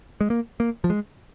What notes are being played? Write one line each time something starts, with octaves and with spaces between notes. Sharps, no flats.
G#3
A#3
A#3
F3
G#3